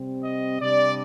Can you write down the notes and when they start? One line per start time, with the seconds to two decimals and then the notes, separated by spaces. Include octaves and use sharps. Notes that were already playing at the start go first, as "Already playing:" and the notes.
Already playing: C3 G3 C4
0.24 D#5
0.61 C3 G3 D4 D5